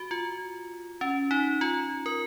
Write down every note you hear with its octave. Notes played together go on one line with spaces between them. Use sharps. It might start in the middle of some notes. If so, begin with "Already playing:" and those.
Already playing: F#4
F4
C#4
D#4
F4
A#4